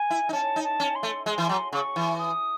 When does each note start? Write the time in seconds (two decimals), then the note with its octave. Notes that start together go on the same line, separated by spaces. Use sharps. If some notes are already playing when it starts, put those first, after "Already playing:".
Already playing: G#5
0.10 E4
0.29 D#4
0.33 C#4 A5
0.56 D#4
0.64 A5
0.80 C#4
0.95 C6
1.03 A3
1.26 G#3 C6
1.38 E3
1.49 F#3
1.73 C#3 C#6
1.96 E3
2.18 D#6